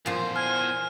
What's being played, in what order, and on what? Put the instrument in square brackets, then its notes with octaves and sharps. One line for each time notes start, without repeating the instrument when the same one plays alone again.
[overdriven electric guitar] E2 C5 [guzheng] A#2 F3
[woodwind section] G#5 [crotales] F6